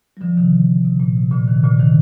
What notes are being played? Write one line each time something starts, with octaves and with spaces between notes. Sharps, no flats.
G3
D3 F3
C3 D#3
C3
A#2
C3
A#2 D3
C3 D#3
A#2 D3
C3 D#3